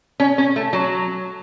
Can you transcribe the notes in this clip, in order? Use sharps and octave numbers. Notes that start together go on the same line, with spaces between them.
C#4
C#4
A3
F#3